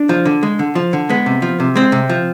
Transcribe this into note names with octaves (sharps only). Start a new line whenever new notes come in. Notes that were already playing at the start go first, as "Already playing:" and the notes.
Already playing: D4
F3
D3
G#3
D3
F3
D3
G#3 B3
C3
F3
C3
G#3 C4
C3
F3